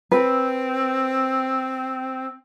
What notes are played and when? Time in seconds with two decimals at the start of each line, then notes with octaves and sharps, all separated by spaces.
0.12 C4 B4